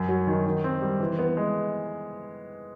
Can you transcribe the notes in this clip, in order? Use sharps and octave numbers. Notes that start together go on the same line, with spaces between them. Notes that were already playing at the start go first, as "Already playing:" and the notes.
Already playing: F#2
F#3
D#3
D#3
C4
G3
E3
B3
G#3